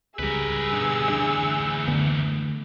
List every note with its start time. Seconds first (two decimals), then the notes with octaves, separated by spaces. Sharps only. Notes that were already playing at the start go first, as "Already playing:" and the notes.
0.19 C#2 G3 G#4 A#4 B4 E6
0.72 G2 B2 D3
1.10 D2 E3 D4
1.88 D3 A3 B3